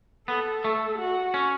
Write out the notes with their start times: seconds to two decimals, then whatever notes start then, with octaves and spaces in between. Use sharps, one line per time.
0.28 B3 A4
0.64 A3
0.98 F#4
1.34 C#4